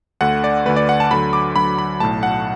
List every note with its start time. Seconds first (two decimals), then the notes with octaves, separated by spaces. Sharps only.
0.21 D2 D3 A3 F#5
0.44 D5
0.65 D2 D3 A3 B4
0.76 D5
0.89 F#5
1.00 A5
1.11 D2 D3 F#3 B5
1.33 D6
1.56 D2 D3 F#3 B5
1.78 B5
2.00 B1 A2 A3 A5
2.23 F#5